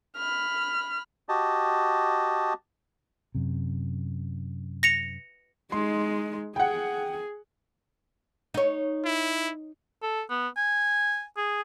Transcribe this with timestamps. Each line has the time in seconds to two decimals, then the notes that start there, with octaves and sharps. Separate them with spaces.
0.17 B5 F6
1.29 F#4 G4 D#5 A5
3.35 F#2 C3
4.83 A#6 C#7 F7
5.72 G#3 D#4 C6
6.56 G#4 F#5 G5
8.54 D#4 C#5
9.05 E4
10.03 A4
10.30 B3
10.57 G#5
11.37 G#4